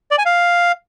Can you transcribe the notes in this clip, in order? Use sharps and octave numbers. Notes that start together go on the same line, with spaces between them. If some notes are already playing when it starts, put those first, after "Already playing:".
D5
G#5
F5